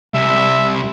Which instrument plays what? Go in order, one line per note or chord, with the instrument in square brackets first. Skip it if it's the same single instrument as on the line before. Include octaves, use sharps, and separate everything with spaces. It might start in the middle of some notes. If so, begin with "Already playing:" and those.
[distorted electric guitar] C2 [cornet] E5